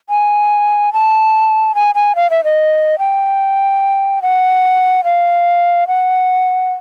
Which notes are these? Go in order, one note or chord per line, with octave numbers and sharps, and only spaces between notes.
G#5
A5
G#5
G#5
F5
E5
D#5
G5
F#5
F5
F#5